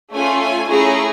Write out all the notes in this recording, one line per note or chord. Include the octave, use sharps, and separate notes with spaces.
A3 C#4 F4 G#5
G#5
A3 C#4 E4 G#4 A#5